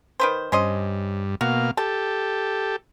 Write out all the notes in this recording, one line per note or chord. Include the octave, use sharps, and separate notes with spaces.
D#3 B4 C5
G2 C#4 C5 D#5
B2 A#3 F#4 F5
G4 A4 A5